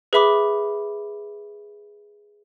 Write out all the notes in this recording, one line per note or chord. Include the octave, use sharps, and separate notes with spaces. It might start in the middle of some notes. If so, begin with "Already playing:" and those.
G#4 B4 E5 B5 D6